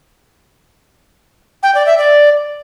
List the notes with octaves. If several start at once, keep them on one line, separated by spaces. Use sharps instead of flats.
G5
D5
E5
D5